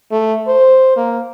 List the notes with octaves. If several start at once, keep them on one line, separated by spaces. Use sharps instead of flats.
A3
C5
A#3